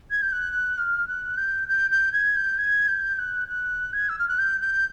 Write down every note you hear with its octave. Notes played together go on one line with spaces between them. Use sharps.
G#6
G6
F#6
F6
F#6
G6
G6
G6
G#6
G6
G#6
G6
F#6
F#6
G#6
E6
F6
F#6
G6
G6